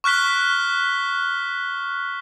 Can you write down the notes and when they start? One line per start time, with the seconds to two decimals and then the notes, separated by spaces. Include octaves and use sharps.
0.04 C#6 F6 F#6 B6 G7